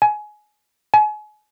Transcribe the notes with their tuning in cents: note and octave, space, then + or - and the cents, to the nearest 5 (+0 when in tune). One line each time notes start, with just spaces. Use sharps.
G#5 +20
G#5 +35